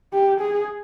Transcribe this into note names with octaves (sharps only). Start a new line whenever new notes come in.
G4
G#4